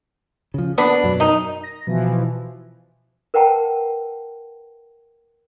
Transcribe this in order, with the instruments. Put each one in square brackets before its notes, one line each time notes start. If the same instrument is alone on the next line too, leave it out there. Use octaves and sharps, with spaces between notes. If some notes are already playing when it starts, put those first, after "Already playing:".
[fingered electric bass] C#3 F3
[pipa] D3 B3 D4 [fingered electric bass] A#3
[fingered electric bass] F#2 B2 F#3
[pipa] D#3 D#4
[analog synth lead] A#6
[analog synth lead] B2 [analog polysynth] E3 F3
[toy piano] A#4 B4 F#5 G5 A5 A#5